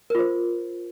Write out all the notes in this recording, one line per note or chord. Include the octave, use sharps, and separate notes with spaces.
F4 A#4 C5